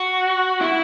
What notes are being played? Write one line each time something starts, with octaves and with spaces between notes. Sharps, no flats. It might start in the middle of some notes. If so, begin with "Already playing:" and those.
Already playing: F#4
E4